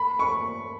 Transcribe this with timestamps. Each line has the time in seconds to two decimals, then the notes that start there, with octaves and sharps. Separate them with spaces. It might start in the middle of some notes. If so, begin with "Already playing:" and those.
Already playing: B5
0.19 C#6